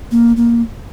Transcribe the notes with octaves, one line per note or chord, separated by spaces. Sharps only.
A#3
A#3